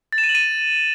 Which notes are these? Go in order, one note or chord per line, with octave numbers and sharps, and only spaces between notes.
A6
E7
D#7
F#7
D#7